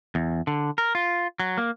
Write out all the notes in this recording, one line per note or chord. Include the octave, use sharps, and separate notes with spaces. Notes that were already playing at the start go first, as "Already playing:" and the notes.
E2
D3
A#4
F4
F#3
A#3